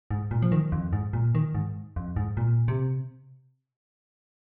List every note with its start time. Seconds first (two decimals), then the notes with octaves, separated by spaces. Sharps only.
0.11 G#2
0.31 A#2
0.42 F3
0.52 D#3
0.72 F2
0.93 G#2
1.13 A#2
1.35 D#3
1.55 G#2
1.96 F2
2.16 G#2
2.37 A#2
2.68 C3